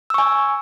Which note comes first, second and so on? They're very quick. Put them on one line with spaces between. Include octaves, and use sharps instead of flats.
E6 C#6 G#5